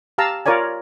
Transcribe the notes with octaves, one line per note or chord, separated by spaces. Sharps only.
G4 F5 A5 A#5 E6
F4 A#4 C#5 D5 G#5